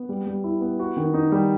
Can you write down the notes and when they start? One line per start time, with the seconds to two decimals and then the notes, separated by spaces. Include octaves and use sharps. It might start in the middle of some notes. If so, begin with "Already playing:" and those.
Already playing: B3
0.09 G3
0.26 G3
0.44 E4
0.61 B3
0.79 F#4
0.97 D#3
1.14 D#4
1.32 G3